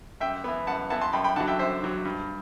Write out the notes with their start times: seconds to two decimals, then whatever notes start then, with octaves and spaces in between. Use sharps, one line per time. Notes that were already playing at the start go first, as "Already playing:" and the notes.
0.21 F#2 E5 G5
0.44 E3 B3
0.67 F#2 F#5 A5
0.90 E3 B3 F#5 A5
1.01 A5 C6
1.13 F#2 G5 B5
1.24 G5 B5
1.36 D3 F#3 F#5 A5
1.47 E5 G5
1.59 F#2 C5 E5
1.82 D3 F#3
2.05 G2